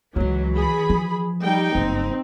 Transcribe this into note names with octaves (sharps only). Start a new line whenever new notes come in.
C#2 E3 F#3 G#3
G#4 B5
F3
G3 D#4 G5
F#1 G2 C4